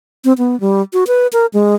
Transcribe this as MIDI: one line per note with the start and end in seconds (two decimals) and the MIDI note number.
0.24 0.33 60
0.38 0.59 59
0.60 0.81 55
0.93 1.04 66
1.07 1.27 71
1.33 1.46 70
1.54 1.75 56